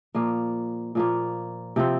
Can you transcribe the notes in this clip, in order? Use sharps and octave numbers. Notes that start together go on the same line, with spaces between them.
A#2 F3 A#3
A#2 F3 A#3
C3 F3 C4